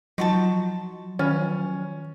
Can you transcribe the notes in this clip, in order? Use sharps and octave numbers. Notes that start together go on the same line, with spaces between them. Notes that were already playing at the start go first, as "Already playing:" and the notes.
F3 F#3 D#4 F4 F#4 A5 C6 C#6
D#3 C#4 F4